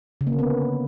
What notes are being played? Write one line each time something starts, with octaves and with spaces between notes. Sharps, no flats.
C#3
A#3
D3
B3